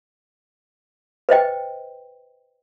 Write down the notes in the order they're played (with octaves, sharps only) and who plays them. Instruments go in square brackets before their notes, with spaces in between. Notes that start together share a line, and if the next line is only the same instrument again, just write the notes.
[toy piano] B4 C5 D#5 G5